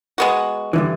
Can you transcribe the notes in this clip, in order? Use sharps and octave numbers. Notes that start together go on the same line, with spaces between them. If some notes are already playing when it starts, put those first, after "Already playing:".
G#3 B3 F#4
G2 D3 E3